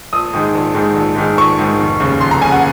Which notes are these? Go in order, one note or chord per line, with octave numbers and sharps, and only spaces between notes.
A#1 D#6
G#2 D#3 G#3
A#1
G#2 D#3 G#3
A#1
G#2 D#3 G#3
A#1 C#6
G#2 D#3 G#3
F1
D#2 C#3
F1 C6
A#5
D#2 C#3 G#5
F#5